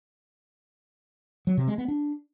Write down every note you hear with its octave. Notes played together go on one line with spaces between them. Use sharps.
F#3
C3
G#3
B3
D4